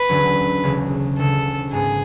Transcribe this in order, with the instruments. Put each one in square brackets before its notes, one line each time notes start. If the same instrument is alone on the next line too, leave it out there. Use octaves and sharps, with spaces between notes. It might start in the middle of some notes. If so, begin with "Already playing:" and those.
Already playing: [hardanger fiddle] B4
[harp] E1 D2 D3 F#3 C#4
E1 D2 C#3
[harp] E1 D2 C#3 [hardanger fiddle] A4
[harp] G#1 G#2 G#3 B3 [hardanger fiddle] G#4